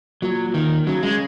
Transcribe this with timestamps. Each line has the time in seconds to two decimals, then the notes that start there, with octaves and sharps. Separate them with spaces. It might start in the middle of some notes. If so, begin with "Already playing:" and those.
0.22 A#2 F#3
0.54 D#3
0.87 C#3 F#3
1.03 G#3